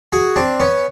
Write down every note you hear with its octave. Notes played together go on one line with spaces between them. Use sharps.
F#4 G#4
C4 D4
B3 C#4